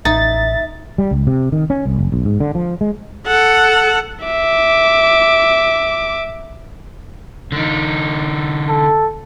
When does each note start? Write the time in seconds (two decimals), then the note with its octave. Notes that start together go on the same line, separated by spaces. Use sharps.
0.05 A1 D#4 E5 A6
0.98 G3
1.11 C#2
1.27 C3
1.52 D#3
1.70 C#4
1.86 C2
1.99 F#1
2.12 B1
2.25 G#2
2.40 D3
2.55 F3
2.81 G#3
3.26 A4 F#5
4.25 E5 D6
7.52 D3 D#4
8.69 A4